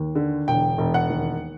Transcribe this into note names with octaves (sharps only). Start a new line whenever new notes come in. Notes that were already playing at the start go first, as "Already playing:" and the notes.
Already playing: D#2
D3
E1 G5
E1
F#5
D#2